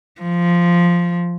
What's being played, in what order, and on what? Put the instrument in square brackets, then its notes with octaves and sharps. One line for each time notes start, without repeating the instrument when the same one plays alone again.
[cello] F3